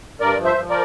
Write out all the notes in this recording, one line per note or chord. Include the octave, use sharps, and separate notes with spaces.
G2 A#4 D5
F3
C5 E5
F3
A#4 D5